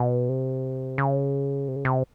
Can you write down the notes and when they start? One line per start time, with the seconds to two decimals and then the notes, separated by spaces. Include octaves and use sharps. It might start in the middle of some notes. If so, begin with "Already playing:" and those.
Already playing: B2
0.29 C3
0.98 C#3
1.68 C3
1.76 C#3
1.85 C3